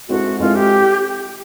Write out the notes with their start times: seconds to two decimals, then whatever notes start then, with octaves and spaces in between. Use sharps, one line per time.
0.09 G#3 C4 E4 F#4 A4
0.40 G#3 C4 E4 F4 A4
0.55 G4